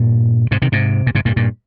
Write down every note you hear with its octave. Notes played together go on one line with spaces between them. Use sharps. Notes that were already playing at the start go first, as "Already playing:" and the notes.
Already playing: G2 A#2
G#2 C3
C3 D#3
G#2 C3
A#2
G#2 C3
G2 A#2
G2 A#2